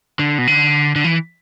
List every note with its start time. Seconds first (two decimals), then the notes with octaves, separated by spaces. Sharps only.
0.19 D3
0.38 B2
0.47 D3
0.96 D3
1.04 E3